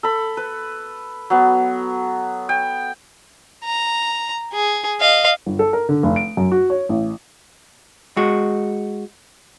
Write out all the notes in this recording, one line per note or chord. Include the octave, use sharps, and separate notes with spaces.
A4 B5
B4
F#3 B3
G5
A#5
G#4
D#5 F5
G1
A4
A#4
D3
F1
D7
F#2
F#4
C#5
A1
G#3 F#4